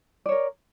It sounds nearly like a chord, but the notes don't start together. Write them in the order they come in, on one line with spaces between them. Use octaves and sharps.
D5 C#5 A#4